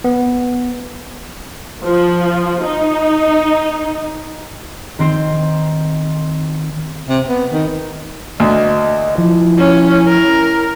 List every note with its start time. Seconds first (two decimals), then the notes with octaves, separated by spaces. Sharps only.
0.04 B3
1.82 F3
2.63 D#4
4.99 D#3 C4 C5
7.09 C3
7.28 B3
7.53 D#3
8.40 D2 D#5
9.18 F3 E4
9.58 C#4
10.07 A#4